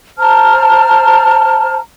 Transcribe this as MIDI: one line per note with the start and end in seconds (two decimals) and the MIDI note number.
0.18 1.78 72
0.18 1.78 81
0.18 1.78 82
0.18 1.78 89